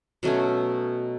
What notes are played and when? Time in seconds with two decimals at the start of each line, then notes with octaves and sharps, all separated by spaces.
0.23 B2 F#3 A3 C#4